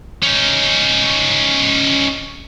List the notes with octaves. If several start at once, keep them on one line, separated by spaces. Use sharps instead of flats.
C#4 D#4